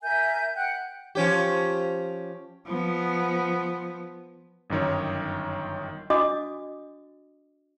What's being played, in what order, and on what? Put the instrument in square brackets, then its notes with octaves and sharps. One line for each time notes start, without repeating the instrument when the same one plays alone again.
[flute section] A#4 E5 G#5 G6
F#5 G5 F#6 G6
[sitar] F3 C#4 G4
[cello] F3 B3
[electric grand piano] G1 F#2 D#3 C#5
[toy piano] D4 F#4 D#5 D6 D#6